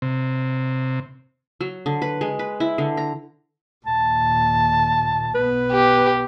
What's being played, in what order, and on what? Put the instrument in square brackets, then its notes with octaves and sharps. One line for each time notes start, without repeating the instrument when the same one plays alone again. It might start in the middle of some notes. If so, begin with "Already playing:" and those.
[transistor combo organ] C3
[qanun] F#3
D3
B4
G#3
B4
E4
D3
A#5
[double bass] D#2 A#2 [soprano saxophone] A5
[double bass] B1 B3 [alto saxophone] B4
[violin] G4